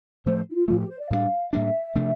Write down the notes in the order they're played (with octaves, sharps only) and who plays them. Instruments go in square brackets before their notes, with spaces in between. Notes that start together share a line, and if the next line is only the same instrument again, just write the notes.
[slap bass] A2 F3 A3 [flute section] C5
[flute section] E4
F4
[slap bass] A2 F3 A3 [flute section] F4
[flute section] G4
C5
D5
[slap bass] A2 G3 A#3 D4 [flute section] F5
[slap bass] A2 G3 A#3 D4 [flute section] E5
[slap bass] C3 F3 A3 D4